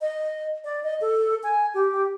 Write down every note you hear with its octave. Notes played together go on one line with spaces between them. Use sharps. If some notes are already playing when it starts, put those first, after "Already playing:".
D#5
D5
D#5
A4
G#5
G4